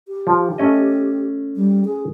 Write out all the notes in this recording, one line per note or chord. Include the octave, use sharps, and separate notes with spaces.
G4
F3
A3 C#4 D#5
G3
G#4